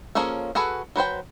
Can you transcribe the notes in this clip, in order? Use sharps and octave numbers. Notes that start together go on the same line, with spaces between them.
F3 A#3 C#4 G#4 A4
F#4 G#4 A4 B4 G#5
F#3 B4 C5 G5